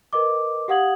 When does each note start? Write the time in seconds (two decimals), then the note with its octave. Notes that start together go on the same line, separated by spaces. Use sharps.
0.13 A#4 B4 D#5 D6
0.68 G4 F5 F#5 D#6 G#6 F#7